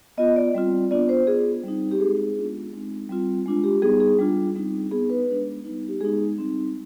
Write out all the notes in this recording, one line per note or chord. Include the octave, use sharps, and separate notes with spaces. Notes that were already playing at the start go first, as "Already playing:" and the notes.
B3 F4 D#5
D5
G3 C4 F4
B3 D4 F4 D5
C5
B3 F4 G#4
G3 C4 D#4
G4
G#3 C4 D#4 G#4
G#3 B3 D4 F4
G#3 C4 D#4
G3 C4 F4
G#3 D4 F4
G4
G3 B3 D#4 G#4
G#4
G3 D4 F4
G3 C4 D#4
B3 D#4 G#4
B4
G#3 B3 D4
G3 B3 D#4
G4
G#3 B3 D#4 G#4
G3 C4 D#4